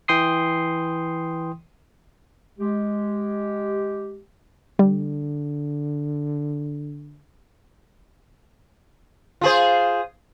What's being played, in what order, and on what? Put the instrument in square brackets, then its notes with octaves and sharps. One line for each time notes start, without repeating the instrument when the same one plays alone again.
[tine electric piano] E3 G5 C6 D#6 C7
[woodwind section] G#3 G4
[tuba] D3 [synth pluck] G3
[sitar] F4 G#4 C5